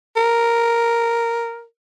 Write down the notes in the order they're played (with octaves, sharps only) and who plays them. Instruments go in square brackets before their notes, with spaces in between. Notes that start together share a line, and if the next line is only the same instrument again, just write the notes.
[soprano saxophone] A#4